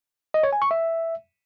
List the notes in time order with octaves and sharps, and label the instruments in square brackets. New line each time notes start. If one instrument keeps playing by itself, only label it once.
[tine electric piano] D#5
C#5
G#5
C#6
E5